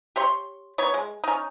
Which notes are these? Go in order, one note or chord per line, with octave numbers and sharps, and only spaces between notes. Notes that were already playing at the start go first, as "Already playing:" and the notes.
G4 C#5 C6
B3 D#4 C#5
G#3
C#4 D#4